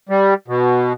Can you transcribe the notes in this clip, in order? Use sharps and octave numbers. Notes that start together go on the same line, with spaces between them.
G3
B2